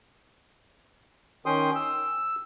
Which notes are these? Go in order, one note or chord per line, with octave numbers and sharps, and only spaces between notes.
D#3 C#4 G5 C6 D#6
E6